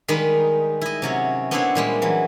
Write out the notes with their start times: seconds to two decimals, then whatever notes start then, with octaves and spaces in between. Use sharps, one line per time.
0.08 D#3 G3 G#3 D#4 B4
0.81 E4 D#5
1.02 C3 F#3 C#4
1.51 B3 C4 D4 E4 C5 C#5
1.75 A#2 G3 G#3
2.02 E3 F#3